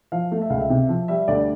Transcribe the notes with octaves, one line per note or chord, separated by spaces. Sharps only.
F3 F5
A3
E5
C#2 F5
E5
C3
F3
G3 E5
D2 D5